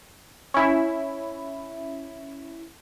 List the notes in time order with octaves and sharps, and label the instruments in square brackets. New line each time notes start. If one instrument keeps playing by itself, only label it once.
[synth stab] C#4 E4